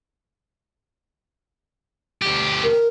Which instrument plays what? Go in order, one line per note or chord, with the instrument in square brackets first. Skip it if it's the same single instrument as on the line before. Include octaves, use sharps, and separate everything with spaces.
[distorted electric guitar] D2 G4
[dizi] A#4